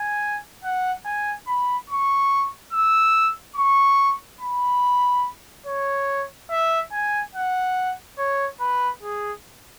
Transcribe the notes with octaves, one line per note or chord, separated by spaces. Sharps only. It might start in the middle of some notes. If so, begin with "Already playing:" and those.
Already playing: G#5
F#5
G#5
B5
C#6
E6
C#6
B5
C#5
E5
G#5
F#5
C#5
B4
G#4